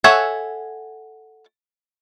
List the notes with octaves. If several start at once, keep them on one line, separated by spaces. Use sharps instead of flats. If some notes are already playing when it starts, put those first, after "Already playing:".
A4 C#5 E5 F#5 G#5